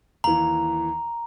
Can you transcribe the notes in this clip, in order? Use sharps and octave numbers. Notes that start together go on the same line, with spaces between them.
D#2 E3 A#5